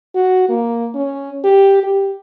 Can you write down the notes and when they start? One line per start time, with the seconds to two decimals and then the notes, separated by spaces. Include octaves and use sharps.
0.15 F#4
0.49 A#3
0.95 C#4
1.44 G4
1.83 G4